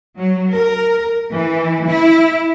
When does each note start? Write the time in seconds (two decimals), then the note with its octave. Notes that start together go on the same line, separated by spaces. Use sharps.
0.16 F#3
0.52 A#4
1.34 E3
1.90 E4